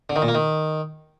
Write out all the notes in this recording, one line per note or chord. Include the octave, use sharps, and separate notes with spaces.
D3
D#3
A#2
A#3
D#3